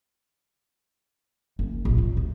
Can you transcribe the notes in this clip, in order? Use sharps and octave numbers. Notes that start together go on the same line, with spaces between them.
F#1
A#1
A2
D2